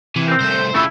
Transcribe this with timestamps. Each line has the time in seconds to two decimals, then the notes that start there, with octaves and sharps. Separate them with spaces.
0.16 C3 E3
0.28 C4 A#4 G5
0.41 C2 A3 C5
0.74 F2 C#3 A3 E4 F4 A4